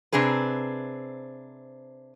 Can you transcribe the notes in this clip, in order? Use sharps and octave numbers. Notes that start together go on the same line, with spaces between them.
C3 C4 D4 G#4 B4